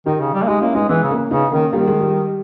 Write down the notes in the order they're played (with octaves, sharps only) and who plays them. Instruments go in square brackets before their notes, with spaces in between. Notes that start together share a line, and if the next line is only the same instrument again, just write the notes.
[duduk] D#3 [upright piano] D#4 G4
[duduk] C#3
G3
A#3
[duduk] G#3 [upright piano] D#4 G4
[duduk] A#3 [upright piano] C#4 E4
[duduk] G#3 [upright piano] B3 D#4
[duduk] E3 [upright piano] G#3 B3
[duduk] C#3
[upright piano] A#3 C#4
[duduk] C#3 [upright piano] B3 D#4
[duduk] D#3 [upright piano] A#3 C#4
[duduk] D#3 [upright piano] G3 A#3
[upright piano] G#3
G3